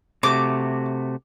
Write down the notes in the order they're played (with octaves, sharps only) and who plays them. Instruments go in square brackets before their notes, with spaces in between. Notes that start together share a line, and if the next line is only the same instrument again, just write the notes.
[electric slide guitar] C3 A3 F#4 [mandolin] D6